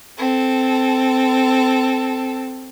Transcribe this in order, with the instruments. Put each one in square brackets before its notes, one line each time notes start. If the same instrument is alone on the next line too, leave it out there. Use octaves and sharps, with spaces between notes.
[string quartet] C4 A4